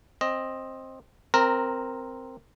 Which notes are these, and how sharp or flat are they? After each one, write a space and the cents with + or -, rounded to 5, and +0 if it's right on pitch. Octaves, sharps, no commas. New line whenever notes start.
C4 +15 D#5 +0
C4 +0 A#4 +0 A#5 -20